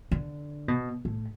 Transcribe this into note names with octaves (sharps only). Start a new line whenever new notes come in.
D3
B2
A2